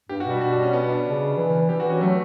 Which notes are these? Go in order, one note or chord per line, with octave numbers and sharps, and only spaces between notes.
G2 G4
F#4
B2 G3
F#4
D4
C#4
B3
D4
C#3
E3
E3 G4
F#4
C#4
F#3 A3